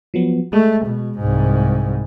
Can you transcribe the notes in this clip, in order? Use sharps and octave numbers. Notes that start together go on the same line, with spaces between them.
F3 F#3 B3
G#3 A3
B2
C2 G#2